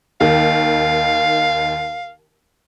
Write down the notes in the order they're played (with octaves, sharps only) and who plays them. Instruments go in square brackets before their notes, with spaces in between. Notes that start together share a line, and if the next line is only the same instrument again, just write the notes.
[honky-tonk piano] D#2 D#3 [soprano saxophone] F5